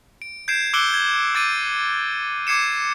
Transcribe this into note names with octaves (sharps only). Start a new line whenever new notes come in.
D7
G6 G#6 C7 D7 E7
D6 E6 F#6 C#7 D7 G7
G#6
D6 A6 D7 D#7
D6 G#6 C7 C#7 E7